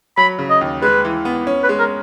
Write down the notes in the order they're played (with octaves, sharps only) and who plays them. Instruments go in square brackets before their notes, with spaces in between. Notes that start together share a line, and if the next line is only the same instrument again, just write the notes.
[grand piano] F#3 [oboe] B5
[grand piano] C#3
[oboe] D#5
[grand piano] D#2
[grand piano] G#3 [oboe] B4
[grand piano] E3
B3
C#4
[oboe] B4
[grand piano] G#3
[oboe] A#4